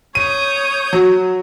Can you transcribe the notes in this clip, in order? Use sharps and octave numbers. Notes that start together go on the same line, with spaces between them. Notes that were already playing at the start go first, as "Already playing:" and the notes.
C#5 D#6 G6 D#7
F#3